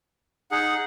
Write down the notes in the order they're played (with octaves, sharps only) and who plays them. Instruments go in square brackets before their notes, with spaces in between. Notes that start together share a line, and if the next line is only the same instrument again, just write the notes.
[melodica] D#4 G#4 [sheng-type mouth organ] F#5